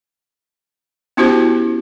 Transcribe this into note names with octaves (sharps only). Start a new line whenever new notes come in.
B3 C#4 E4 F#4 G4 C5